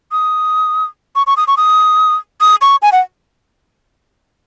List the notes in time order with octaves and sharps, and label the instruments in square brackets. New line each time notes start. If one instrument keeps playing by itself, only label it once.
[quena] D#6
C#6
C#6
D#6
C#6
D#6
D#6
C#6
G#5
F#5